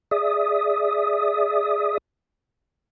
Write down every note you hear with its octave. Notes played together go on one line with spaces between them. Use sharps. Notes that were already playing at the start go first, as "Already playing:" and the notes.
G#4 D5 E5 D#6